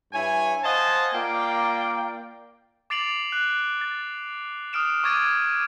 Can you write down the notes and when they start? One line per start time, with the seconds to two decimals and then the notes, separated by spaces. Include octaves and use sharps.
0.13 G2 E4 C#5 G#5
0.64 C5 D#5 F5 F#5 G#5 A5
1.14 A#3 F4 A#4 D5 G5
2.90 D6 A6 C7 D7 F7 F#7
3.32 F#6
3.81 A6
4.73 D#6 F6 D7 E7
5.04 C#6 D6 G#6 A6 D7 D#7